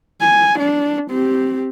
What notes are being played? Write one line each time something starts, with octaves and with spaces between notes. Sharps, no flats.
G#5
D4
C4 G4